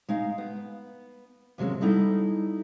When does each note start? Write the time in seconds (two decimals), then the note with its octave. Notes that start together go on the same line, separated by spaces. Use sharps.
0.09 G#3 D#4 F5
0.38 B3
1.58 D#2 C3 F#3 G#3 C#4
1.81 G3 B3 D#4 E4 A4 D#5